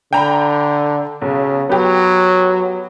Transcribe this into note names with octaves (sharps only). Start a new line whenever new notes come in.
D3 G5 A#5 B5
B1 C#3
F#3 B3 G4